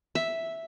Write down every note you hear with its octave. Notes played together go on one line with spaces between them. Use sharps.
E5